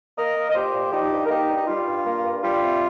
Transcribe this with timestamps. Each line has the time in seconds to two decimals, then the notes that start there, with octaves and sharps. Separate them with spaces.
0.17 A#3 A#4 D#5
0.36 A#3
0.49 D#5
0.54 A#2 G4 C5
0.73 A#2
0.92 F3 D#4 G4
1.11 G2
1.25 A#4
1.29 A#3 D#4 G4
1.49 G2
1.57 D#4
1.67 G3 F4
1.86 G2
2.05 A#3
2.24 G2
2.42 G3 F4
2.61 C3